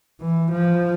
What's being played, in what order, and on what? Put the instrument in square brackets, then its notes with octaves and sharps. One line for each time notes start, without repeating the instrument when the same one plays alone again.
[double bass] E3
F3